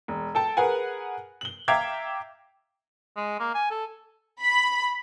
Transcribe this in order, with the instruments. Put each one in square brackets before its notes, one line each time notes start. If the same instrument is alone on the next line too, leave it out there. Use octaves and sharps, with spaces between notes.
[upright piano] E1
A4 G5 A5
G#4 A#4 B4 F#5 G#5
F#7 G7
E5 F5 G5 A#5 D6 G#6
[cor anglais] G#3
A#3
G#5
A4
[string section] B5